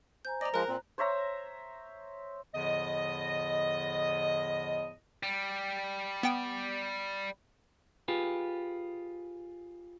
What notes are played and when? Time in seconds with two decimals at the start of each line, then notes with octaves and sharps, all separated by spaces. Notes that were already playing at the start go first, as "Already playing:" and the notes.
0.25 C5 G#5 A#5 G6
0.41 C5 D5 D#5 A#5 A#6
0.54 F3 G#3 A#4 A#5 F#6
0.68 A#2 C4
0.98 C5 C#5 E5 A#5
2.55 E2 A2 D3 F3 D#5
5.23 G3
6.23 B3 G5
8.08 F4 G4 G#4 B4